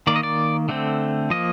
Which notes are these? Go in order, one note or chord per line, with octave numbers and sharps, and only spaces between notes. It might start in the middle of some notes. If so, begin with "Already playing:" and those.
D#3 A#3 D5
D#5
D5
D3 A3 C4
F3 A#3 D#5